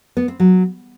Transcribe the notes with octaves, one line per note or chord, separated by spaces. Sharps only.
B3
C4
F#3